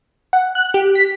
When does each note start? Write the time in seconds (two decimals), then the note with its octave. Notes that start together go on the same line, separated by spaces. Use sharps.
0.33 F#5
0.55 F#6
0.74 G4
0.95 B6